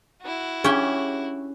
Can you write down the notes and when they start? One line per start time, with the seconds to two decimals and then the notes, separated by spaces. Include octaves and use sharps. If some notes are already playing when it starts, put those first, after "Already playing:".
0.22 E4 F#4
0.64 C#4 D4 G4 G#4 C#6